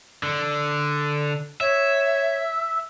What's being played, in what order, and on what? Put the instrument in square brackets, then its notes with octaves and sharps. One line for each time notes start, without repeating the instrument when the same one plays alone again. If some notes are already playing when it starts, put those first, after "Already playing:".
[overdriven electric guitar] D3
[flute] C#5 [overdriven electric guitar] E5